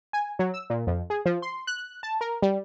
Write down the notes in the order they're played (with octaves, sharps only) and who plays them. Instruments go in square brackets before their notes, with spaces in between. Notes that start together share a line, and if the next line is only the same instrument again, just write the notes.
[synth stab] G#5
F#3
E6
A#2
F2
G#4
F3
C6
F#6
A5
A#4
G3